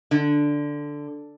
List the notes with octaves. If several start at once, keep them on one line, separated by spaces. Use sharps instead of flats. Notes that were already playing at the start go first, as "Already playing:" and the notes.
D3